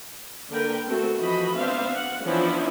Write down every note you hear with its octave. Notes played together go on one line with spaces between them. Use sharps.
D3 A#3 A#4 B4 G5
A3 B3 C4 F#4 A4
E3 F3 F#4 D#5 B5
B3 C4 D4 C5 E5 F5
F#5
E3 F3 B3 C#4 D4 E4